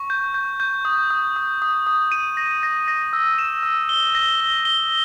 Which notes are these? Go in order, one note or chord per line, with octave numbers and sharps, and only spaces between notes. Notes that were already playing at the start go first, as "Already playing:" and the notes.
Already playing: C#6
G6
G6
G6
D#6
D#6
D#6
D#6
D#6
D#7
A#6
A#6
A#6
E6
E7
E6
G7
A#6
G7
G7